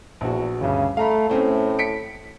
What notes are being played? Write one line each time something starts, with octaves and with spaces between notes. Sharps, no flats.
A#1 E2 F#4
D2 G2 C#3
A3 F5 A#5 B5
A2 A3 C4 C#4
B6 C#7 D7